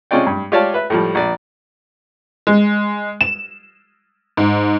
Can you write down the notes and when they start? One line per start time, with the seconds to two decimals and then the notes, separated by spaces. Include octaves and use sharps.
0.11 C3 G#3 C#4 F4 D5 G5
0.27 G2
0.52 F4 G4 C#5 D5 F5 A5
0.74 B4 E5
0.90 A2 F3 G3
1.15 A#1 D5
2.47 G#3
3.21 E7
4.37 G#2